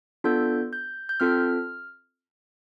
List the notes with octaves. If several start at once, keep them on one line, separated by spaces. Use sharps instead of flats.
B3 D4 F4 A4 G6
G6
G6
C4 F4 A4 F6